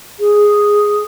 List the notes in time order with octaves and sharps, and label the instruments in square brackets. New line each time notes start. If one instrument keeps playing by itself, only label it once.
[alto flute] G#4